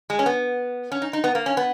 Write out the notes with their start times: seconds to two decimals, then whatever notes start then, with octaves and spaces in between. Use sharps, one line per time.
0.10 G#3
0.19 C#4
0.26 B3
0.92 C#4
1.02 D#4
1.13 D#4
1.24 B3
1.35 A#3
1.46 C#4
1.57 B3